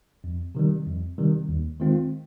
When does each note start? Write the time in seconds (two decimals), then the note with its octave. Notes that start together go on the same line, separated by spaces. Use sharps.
0.24 F2
0.55 C3 D#3 G3
0.87 F2
1.18 C3 D#3 G3
1.49 D#2
1.80 D#3 G#3 C4 F4